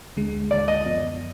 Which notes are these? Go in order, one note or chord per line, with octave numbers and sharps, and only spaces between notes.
D2 D3 G#3
D2 D3 G#3 D5
D#5
F#2 F3 B3 F4